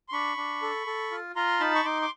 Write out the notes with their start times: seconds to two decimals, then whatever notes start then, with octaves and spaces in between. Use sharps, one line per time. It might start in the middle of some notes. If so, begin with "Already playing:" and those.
0.09 C6
0.13 D4 B5 C#6
0.37 D4
0.62 A4
0.87 A4
1.11 F4
1.36 F4 A#5 C6
1.60 D#4 A5 B5
1.75 C#6
1.85 D#4 C6 D6
2.02 D6